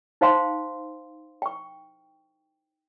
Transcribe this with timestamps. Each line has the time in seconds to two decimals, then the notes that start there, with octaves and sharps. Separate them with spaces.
0.21 D#4 C5 F5 G5 C6
1.42 G5 C#6